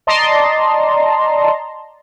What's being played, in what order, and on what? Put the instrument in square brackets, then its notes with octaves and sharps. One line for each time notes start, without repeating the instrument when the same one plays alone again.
[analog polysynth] D5 D#5 A5 A#5 C6